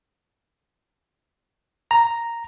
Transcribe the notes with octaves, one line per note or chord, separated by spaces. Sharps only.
A#5